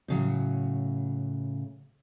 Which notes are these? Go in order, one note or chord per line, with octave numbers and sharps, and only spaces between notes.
A2 C#3 F#3